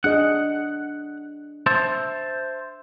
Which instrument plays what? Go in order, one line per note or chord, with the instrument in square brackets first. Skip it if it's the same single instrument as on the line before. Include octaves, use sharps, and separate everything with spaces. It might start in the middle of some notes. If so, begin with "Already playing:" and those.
[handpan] D4 G#4 D#5 [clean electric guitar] F#5
[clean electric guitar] C5 E5 A5